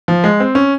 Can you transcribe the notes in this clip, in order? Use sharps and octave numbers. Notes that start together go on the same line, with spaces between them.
F3
G#3
C4
C#4